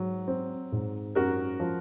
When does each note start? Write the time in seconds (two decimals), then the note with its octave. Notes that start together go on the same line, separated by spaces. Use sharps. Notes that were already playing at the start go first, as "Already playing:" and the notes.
Already playing: G#2 F#3
0.28 C4
0.72 G#2
1.15 F#2 F#4 A#4
1.60 F3